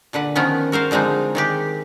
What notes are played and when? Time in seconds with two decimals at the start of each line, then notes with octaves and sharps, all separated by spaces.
0.13 A#2 D3 B4 F#5
0.36 D#3 F3 B3 C#4
0.72 F#4 A#4 C5 F5
0.91 D3 F3 G#3 C4 D#4
1.35 D#3 G#3 G4